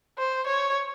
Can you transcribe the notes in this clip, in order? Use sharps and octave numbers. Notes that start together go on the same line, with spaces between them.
C5
C#5